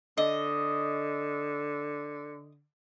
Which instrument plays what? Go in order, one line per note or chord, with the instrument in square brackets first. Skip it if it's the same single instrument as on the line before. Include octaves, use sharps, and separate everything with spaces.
[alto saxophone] D3 [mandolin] D#5